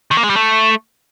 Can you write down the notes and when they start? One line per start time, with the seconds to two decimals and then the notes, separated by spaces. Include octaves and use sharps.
0.11 D#3
0.17 A#3
0.23 G#3
0.30 G3
0.36 A3